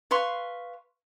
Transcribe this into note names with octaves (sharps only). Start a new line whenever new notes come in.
B4 F5 C6 C#6